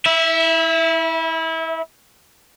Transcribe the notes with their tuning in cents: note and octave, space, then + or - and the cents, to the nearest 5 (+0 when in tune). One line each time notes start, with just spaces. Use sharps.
E4 -25 E5 +0